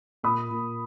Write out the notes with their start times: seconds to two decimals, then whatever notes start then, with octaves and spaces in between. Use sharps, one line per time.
0.23 A#2 B5 D#6
0.50 A#2